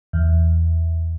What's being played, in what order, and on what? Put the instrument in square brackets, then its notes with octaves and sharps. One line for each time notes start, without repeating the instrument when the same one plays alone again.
[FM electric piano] E2